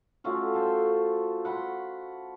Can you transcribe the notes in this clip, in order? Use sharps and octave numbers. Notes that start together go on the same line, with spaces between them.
A3 C#4 F4 F#4
A4 C5
F#5 B5 C6